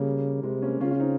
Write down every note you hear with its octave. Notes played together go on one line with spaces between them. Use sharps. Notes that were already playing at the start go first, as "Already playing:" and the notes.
Already playing: C#3 G3 A#3
C3 G#3 C4
A#3 C#4
C#3 C#4 F4
C#4 F4
C4 D#4